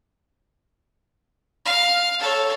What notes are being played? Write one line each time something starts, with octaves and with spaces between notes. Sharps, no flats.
F5
A4 C#5